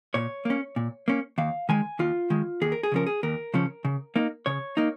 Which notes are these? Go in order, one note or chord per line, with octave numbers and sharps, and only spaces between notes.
A#2 C#5
A#3 C#4
A#2
A#3 C#4
D#2 F5
D#3 G#3 G#5
D#2 F4
D#3 G#3
D#2 G#4
A#4
G#4
C#3 F3 C#4 A#4
G#4
D#2 A#4
C#3 F3 C#4
C#3
A#3 D#4
C#3 C#5
A#3 D#4